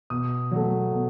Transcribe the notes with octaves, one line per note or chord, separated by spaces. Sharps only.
B2 D#6
F#3 A3
B2